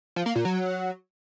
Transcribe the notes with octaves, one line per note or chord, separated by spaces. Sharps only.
F3
A#3
A#2
F#3